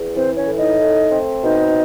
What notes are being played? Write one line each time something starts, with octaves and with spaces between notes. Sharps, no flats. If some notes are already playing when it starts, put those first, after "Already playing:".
Already playing: E2
E3 C4 C5
C#4 C#5
A2
D#4 D#5
A3
C4
B2 D#4 D#5